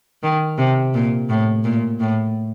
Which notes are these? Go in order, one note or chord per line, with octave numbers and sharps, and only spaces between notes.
D#3
C3
A#2
A2
A#2
A2